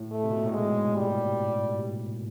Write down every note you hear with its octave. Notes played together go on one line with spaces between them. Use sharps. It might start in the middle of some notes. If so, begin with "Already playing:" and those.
Already playing: A2
A3
C3
B2
A#2
A2
G#2 G#3
G3